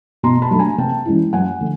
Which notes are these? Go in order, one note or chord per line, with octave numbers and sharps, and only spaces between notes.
B2 A#5 C6
A5 B5
F#3 A3 D4
G#5 A#5
C3 G5 A5
E3 G#3 C#4 E4
F#2 F#5 G#5
D3 F3 A3